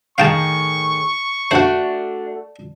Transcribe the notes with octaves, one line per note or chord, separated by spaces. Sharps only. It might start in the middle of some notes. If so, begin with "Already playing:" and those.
A2 D#3 G#4 F5 G5 A5 C#6
A3 D4 F#4 C5 F#5